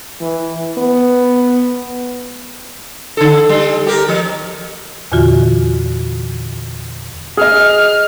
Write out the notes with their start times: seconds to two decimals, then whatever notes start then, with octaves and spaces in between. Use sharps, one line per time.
0.21 E3
0.78 B3
3.17 D3 A4
3.49 G3
3.87 G4 A#4
4.09 F3
5.12 E2 A#2 D3 E3 F4 F#4
7.37 G#4 D#5 F6